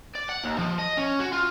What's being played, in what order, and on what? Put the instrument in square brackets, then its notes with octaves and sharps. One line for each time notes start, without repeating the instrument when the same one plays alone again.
[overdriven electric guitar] D5
F#5
D#2
F3
D#5
C#4
F#4
F4